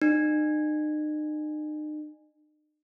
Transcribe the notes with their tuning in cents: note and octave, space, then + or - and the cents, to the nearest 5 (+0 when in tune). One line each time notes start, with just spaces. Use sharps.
D#4 -40